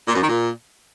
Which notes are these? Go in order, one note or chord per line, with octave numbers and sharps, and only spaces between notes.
A#2
F#2
D#3
A#2